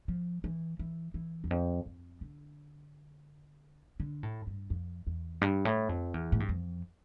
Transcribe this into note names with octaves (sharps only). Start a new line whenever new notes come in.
F3
E3
E3
E3
E2
F2
F2
D3
D3
A2
G2
F2
E2
G2
A2
F2
E2
A2
G2
F2